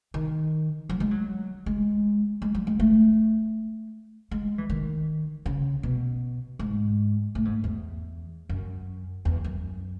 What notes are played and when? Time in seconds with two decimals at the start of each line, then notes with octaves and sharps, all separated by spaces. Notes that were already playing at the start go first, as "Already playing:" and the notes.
0.14 D#3
0.89 F#3
1.00 G#3
1.11 F#3
1.66 G#3
2.42 G#3
2.54 F#3
2.67 G#3
2.80 A3
4.31 G#3
4.58 E3
4.70 D#3
5.46 C#3
5.83 B2
6.59 G#2
7.35 A2
7.45 G#2
7.64 E2
8.49 F#2
9.25 E2
9.44 F#2